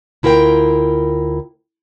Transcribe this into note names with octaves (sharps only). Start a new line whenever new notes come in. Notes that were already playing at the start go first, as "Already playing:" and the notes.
D2 E4 F4 A#4 G5